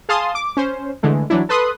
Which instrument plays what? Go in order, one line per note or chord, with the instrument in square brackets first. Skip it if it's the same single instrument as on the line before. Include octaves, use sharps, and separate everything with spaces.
[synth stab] G#4 F5 A5 C6 D#6
D6
C#4 C5
D3 E3 G#3 A3
E3 F#3 D4 E4
A4 B4 C6 D#6 F#6